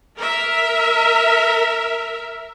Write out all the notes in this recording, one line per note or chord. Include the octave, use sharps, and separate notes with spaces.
A#4 E5